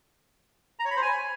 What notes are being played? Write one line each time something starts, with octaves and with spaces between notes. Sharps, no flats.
A#5
C#5
B5
C5
G#5